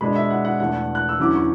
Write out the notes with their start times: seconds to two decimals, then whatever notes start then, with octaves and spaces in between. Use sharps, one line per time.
0.01 B2 G#3 D4 B5
0.16 E5
0.30 F#5
0.45 F#5
0.60 E2 B2 A3 D4 F#5
0.95 F#6
1.09 E6
1.19 E2 D3 F#3 C#4 E4 D6
1.35 C#6